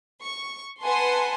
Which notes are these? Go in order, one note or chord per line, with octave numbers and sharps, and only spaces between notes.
C#6
B4 F#5 G#5 A5 C6